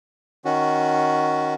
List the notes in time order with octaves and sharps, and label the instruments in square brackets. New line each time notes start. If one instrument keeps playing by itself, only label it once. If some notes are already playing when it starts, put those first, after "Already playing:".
[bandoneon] D#3 C#4 F#4